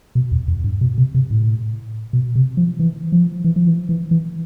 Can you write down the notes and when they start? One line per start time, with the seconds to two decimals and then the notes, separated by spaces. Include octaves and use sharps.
0.15 B2
0.32 E2
0.48 F2
0.64 G2
0.81 B2
0.98 C3
1.14 C3
1.31 A2
2.13 B2
2.35 C3
2.57 F3
2.79 E3
3.12 F3
3.44 E3
3.56 F3
3.67 E3
3.89 E3
4.11 E3